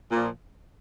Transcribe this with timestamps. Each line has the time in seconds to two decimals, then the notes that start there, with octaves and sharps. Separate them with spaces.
0.11 A#2 F3